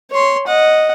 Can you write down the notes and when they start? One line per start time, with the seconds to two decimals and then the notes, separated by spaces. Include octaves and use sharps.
0.11 C#5 C6
0.47 D#5 F#5